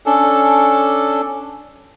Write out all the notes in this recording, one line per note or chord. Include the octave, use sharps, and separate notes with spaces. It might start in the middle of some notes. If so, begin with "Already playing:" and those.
C#4 D4 A4